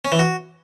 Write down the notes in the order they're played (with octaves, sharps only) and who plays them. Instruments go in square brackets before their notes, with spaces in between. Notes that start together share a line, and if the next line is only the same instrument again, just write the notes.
[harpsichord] C#4
E3
F#4